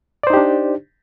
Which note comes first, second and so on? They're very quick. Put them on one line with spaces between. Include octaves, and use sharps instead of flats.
D5 C5 D#4 G4 D4